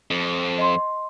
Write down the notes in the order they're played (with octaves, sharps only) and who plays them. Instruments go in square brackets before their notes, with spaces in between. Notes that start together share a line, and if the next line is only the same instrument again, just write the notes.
[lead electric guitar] F2
[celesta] D#5 C6